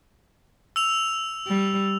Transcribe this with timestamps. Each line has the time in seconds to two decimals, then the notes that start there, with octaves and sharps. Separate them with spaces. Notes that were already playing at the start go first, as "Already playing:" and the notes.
0.76 E6 F7
1.47 G3